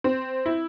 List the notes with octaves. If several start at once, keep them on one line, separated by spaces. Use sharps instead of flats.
C4
E4